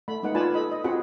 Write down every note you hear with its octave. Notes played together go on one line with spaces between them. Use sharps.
A3 B5
G#3 A#3 D#4 B4 F#5
F4 B4 D5 G#5 A5 B5
A4 D#5 B5
D#5
C4 F4 F#4 G#4 F#5 B5